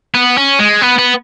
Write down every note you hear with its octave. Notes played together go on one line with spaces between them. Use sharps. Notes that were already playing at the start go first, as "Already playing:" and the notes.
B3
C#4
G#3
B3
B3